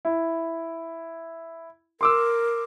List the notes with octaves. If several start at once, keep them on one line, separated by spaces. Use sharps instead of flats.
E4
A#4 C6 D6 E6